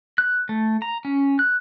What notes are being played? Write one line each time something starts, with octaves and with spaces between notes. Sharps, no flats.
F#6
A3
A#5
C#4
F#6